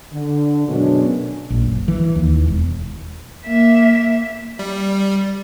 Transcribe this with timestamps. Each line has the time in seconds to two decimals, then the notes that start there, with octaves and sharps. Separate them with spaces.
0.12 D3
0.67 F#2 B2 G#3 A3 C#4 D4
1.50 A#1
1.64 F#1
1.88 E3
2.16 D#2
2.48 E1
3.46 A#3 E5
4.59 G3